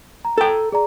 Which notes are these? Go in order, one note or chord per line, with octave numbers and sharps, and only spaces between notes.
A#5
A4 G5
G#4 D5 A#5